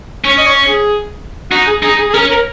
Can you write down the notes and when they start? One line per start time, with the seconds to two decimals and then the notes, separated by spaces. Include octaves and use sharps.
0.24 C#4 C#5
0.37 D#5
0.46 C#5
0.68 G#4
1.51 D#4 F#4
1.67 G#4
1.83 D#4 G#4
1.99 G#4
2.10 G#4
2.14 C#4 A#4
2.30 A#4